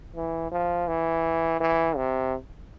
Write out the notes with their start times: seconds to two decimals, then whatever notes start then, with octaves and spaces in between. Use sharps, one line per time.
0.16 E3
0.52 F3
0.88 E3
1.60 E3
1.96 C3